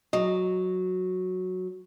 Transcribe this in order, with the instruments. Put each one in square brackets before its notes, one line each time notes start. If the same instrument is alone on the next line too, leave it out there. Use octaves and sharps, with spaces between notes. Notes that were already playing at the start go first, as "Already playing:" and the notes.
[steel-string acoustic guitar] F#3 [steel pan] D#5